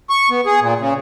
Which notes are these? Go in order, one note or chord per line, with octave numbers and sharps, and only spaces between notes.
C#6
B3
G#4
A#2
C#3